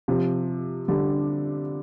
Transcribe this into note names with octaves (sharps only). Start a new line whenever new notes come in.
C3 F3
D3 G3